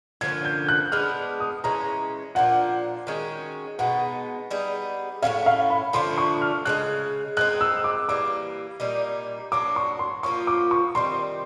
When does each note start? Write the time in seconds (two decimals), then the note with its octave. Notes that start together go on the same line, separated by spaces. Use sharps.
0.21 D3 F3 A#3 C#4 G#6
0.45 G6
0.69 F#6
0.92 G#3 B3 D4 F6
1.40 D#6
1.64 E3 G#3 C#4 A#5
2.35 A#2 F3 A#3 D4 F#5
3.07 D#3 G#3 C#4 F#4
3.79 B2 G#3 B3 D#4 F#5
4.51 G3 B3 D#4 G#4
5.22 A2 F3 A3 C#4 F5
5.46 F5
5.70 B5
5.93 D3 F3 A3 D4 C6
6.18 C#6
6.41 F6
6.65 C#3 E3 G#3 F#6
7.37 G#3 C4 D#4 F#6
7.61 E6
7.84 D6
8.09 E3 G3 A#3 D6
8.80 A#2 G3 A#3 D#4
9.52 F#3 A#3 D4 D6
9.76 C#6
9.99 C6
10.23 F3 A#3 C#4 F4 C#6
10.47 D6
10.71 C#6
10.95 D#3 G3 C4 C6